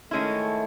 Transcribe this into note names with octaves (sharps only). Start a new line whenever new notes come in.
D#3 G#3 A3 C#4 E4